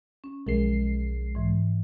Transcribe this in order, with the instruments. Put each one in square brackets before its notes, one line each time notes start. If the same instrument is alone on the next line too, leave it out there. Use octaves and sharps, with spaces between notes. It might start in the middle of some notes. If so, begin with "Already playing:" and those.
[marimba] C#4
[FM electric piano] B1 G#3 C7 [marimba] F3 A#4
[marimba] G#2 E3